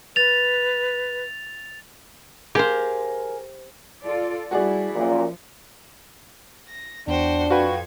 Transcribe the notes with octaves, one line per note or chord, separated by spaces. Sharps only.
B4 A6 F7
G4 G#4 A#4 C5 F5
F4 A4 D5
G3 A3 E4 F#4 G#4 D5
F#2 A#2 F3
A#6
E2 D4 F#4 C5 G5
F2 F#4 B4 F5 G5 G#6